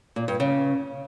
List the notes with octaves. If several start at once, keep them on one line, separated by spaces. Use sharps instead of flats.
A#2
G2
C#3